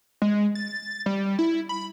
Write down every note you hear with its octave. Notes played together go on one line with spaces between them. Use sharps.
G#3
A6
G3
E4
B5